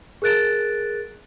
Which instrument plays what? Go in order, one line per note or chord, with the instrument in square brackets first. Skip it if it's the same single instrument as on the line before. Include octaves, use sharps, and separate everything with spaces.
[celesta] G#4 A#4 F#6 A6 D7